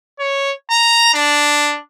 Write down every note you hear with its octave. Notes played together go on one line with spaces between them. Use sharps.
C#5
A#5
D4